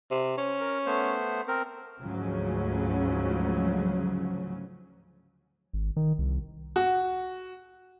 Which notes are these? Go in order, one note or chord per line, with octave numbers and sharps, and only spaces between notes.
C3
C#4
A#4
A3 B3 C5
C4 A#4
D2 G#2 C#3 F3 F#3 C#4
G#1
D#3
C2
F#4